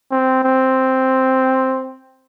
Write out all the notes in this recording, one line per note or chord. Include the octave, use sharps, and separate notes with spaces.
C4
C4